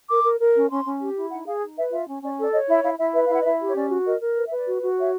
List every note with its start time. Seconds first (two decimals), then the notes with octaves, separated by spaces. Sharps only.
0.09 A#4 D6
0.24 A#4
0.39 A#4
0.55 C#4
0.70 C#4 C6
0.85 C#4
1.00 G4
1.16 E4
1.30 D#4 F#5
1.46 G#4 F5
1.62 D#4
1.77 B4 E5
1.92 F4 E5
2.07 C#4
2.23 C#4 D5
2.38 A4 D5
2.53 C#5 D#5
2.68 E4 E5
2.84 E4 F5
2.98 E4 E5
3.14 B4 E5
3.25 F5
3.29 E4
3.34 F#5
3.41 D#5
3.45 E4 E5
3.60 G4
3.68 C#5
3.75 C#4 D5
3.90 F#4
4.05 A#4 D#5
4.21 A#4
4.37 B4
4.47 E5
4.51 B4
4.57 D5
4.67 F#4
4.82 F#4
4.98 C#5 E5